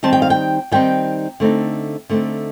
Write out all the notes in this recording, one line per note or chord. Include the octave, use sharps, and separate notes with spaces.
D#3 G3 C4 D#4 A5
G5
F5
G5
D#3 G3 C4 D#4 G5
D3 A3 C4 D#4
D3 A3 C4 D#4